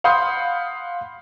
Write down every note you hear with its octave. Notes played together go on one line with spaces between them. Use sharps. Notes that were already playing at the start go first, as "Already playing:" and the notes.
F5 F#5 B5 C6 D#6 G6